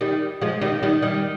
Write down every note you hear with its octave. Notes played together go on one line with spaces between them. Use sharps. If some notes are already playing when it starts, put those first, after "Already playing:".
D#3 G3
F3 G#3
D#3 G3
D#3 G3
D#3 G3